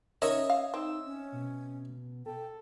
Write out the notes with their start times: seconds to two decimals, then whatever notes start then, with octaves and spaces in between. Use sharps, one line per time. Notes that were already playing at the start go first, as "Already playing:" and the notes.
0.22 C#4 D#4 A#4 C#5 D#5 E5
0.50 F5
0.74 C4 D#4 E6
1.06 C#4
1.32 B2
2.26 A4 G5